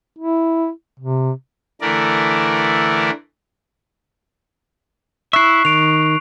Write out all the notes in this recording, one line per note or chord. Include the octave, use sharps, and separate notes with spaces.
E4
C3
D3 E3 A3 A#4 D5
E4 E5 C#6 F#6 C7
D#3 D7 F7